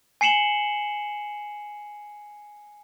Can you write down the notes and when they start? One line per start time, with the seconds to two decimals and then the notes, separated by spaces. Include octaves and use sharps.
0.21 G#5 C7 C#7 E7 F#7 G7